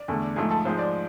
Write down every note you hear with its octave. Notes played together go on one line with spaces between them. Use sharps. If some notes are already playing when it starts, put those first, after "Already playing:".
Already playing: D5
E2 D3 A3
G#2 F3 A3 G#4
A4
G#2 F3 G#3 C5
D5